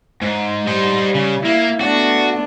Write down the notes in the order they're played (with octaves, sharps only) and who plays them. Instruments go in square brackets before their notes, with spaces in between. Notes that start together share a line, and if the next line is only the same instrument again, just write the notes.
[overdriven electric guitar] G#2
[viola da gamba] G3 [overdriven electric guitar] D#4 C5
[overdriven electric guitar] C#3
[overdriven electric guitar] A#3 [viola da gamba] E4
[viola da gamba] A3 B3 D4 [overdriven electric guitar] F#4